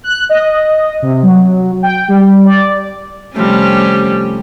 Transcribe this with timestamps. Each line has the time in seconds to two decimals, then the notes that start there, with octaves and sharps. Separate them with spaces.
0.04 F#6
0.29 D#5
1.02 C3
1.23 F#3
1.83 G5
2.08 G3
2.46 D5
3.36 C3 F3 G3 A3 C#4